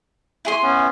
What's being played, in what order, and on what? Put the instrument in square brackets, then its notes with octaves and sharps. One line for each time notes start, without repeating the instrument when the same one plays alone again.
[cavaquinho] E4 G#4 C6
[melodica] B3 C#4